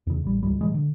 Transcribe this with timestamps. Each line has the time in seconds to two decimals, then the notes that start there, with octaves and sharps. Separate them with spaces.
0.07 E2 C#3
0.24 A1 G3
0.43 D#1 C#2 G#2 G3
0.61 A2 E3 G3 G#3
0.74 D3